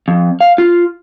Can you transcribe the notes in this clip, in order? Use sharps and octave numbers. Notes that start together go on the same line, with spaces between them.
F2
F5
F4